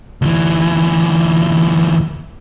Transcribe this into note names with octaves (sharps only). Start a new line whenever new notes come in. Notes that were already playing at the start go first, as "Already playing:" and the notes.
D2 E3